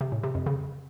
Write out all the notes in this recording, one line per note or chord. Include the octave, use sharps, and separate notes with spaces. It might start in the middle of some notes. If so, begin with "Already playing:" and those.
C3
A2
C3
F2
C#3